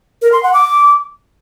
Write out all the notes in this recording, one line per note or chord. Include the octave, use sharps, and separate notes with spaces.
A#4
C6
F#5
D6